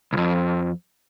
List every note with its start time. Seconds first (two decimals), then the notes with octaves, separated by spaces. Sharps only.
0.13 C2 F2